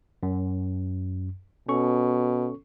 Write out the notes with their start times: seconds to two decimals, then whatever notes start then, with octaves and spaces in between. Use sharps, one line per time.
0.23 F#2
1.69 B2 C#4 A4 C#6